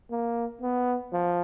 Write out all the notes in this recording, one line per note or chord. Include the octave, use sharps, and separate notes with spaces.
A#3
B3
F3